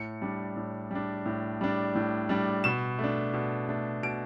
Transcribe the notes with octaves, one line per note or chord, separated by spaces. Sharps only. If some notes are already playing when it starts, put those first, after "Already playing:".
Already playing: A2 C#7
G3 D4
A2
G3 D4
A2
G3 D4
A2
G3 D4
B2 E7
A3 D4
B2
A3 D4
B2 D7